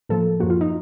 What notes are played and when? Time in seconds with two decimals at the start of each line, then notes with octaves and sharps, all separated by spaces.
0.09 A2 F3 A#3 A4
0.40 F#2 F3 A#3 F#4
0.50 F4
0.61 D#4